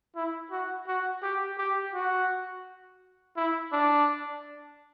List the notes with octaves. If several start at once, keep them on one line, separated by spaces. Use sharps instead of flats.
E4
F#4
F#4
G4
G4
F#4
E4
D4